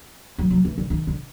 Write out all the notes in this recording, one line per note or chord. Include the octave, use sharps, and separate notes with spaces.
F#3
F#3
E3
D3
D#3
D3